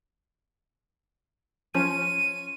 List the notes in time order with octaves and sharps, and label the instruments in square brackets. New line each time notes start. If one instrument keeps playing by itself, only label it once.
[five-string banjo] F3 C#4 C#5 [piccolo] D#7